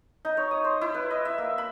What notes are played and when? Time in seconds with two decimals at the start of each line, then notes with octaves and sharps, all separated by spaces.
0.25 D#4
0.37 C#5
0.51 D#6
0.64 C5
0.81 E4
0.94 B4
1.11 D#5
1.25 E5
1.38 A#3
1.58 B5